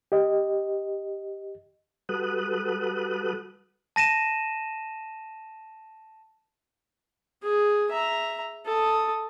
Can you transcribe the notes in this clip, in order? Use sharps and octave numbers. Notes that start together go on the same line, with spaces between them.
G4 D#5
G3 F#4 A4 B4 D#6 F#6
A5 A#6 D#7 E7
G#4
E5 A#5
A4 D#6